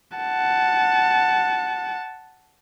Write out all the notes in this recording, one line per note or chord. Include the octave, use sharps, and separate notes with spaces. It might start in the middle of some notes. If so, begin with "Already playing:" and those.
F#5 A5